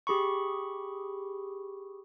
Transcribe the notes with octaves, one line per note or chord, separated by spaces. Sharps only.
G4 G#4 B5 C#6